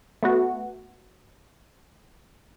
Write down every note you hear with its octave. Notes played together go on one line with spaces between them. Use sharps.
A3 B3 F#4